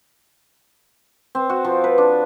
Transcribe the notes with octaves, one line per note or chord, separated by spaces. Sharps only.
C4
F#4
F3
B4
D4